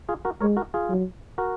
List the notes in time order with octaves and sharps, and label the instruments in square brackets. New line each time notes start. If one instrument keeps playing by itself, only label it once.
[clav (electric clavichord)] F4 G#4
F#4 A#4
[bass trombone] G#3 [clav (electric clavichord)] A#4 C#5
[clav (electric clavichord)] F#4 A#4
F4 G#4
[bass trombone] F#3
[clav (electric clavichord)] F#4 A#4